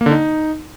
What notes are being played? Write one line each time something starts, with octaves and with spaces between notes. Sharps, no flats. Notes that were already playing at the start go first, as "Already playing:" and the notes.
A#3
D3
D#4